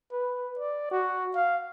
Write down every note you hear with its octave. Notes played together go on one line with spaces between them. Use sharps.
B4
D5
F#4
F5